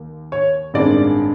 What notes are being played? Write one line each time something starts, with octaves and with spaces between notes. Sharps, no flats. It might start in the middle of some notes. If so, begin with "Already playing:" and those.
Already playing: D#2
C#5
A1 G2 D#3 G#3 C4 D5